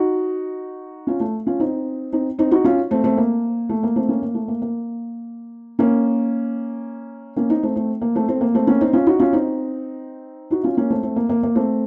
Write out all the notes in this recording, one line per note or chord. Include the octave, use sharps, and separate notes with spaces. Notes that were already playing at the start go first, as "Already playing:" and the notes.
Already playing: D#4 F#4
C#4 F4
A3
C#4 F4
C4 D#4
C4 D#4
C4 D#4
D#4 F#4
C#4 F4
A3 C4
A3 C4
A#3
A3
A#3
A3 C4
A#3 C#4
A#3
A3
A#3
A#3
A#3 C#4
A#3 C#4
C4 D#4
A3 C4
A3 C4
A#3
A3 C4
A3 C4
A#3
A3 C4
A#3 C#4
C4 D#4
C#4 F4
D#4 F#4
C#4 F4
C4 D#4
D#4 F#4
C#4 F4
A#3 C#4
A3 C4
A3 C4
A#3
A#3
A#3
A3 C4